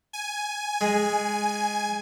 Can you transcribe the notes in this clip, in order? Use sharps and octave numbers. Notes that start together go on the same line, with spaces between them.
G#5
G#3